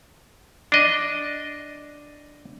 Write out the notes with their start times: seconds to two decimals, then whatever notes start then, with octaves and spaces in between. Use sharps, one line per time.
0.72 D4 D#5